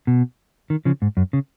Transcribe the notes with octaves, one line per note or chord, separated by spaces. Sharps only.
B2
D#3
C#3 F3
G#2
F#2
C#3